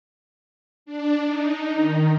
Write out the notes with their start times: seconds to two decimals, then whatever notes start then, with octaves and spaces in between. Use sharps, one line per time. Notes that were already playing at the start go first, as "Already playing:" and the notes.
0.86 D4
1.26 D#4
1.75 D#3